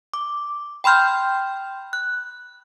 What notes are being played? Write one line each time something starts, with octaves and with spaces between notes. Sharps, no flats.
D6
G5 B5 C6 F6 G6
F#6